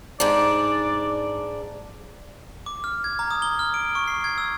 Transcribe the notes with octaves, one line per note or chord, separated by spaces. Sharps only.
G#2 D4 D5
D6
F6
G#6
A#5
D#6
G7
F6
D7
C#6
C7
G#6
E6